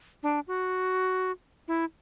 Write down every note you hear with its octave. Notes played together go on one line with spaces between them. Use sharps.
D4
F#4
E4